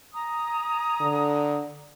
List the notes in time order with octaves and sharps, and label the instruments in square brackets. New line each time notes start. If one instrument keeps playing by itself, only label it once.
[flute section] G#5 A#5 D#6
[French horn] D3